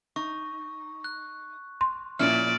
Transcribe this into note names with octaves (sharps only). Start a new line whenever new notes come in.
D#4 C#6
F#6
C6
A#2 F3 C#4 E4 D5 F6